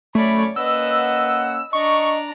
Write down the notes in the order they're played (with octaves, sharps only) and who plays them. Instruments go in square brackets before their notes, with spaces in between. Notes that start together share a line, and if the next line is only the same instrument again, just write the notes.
[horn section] F#2 C#4 B5 [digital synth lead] A3 [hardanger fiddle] C#5 D5
[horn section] A#3 C#4 F#5 [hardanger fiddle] B4 D#5 [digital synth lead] E6
[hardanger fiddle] D4 A#5 [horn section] D#5 [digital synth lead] C#6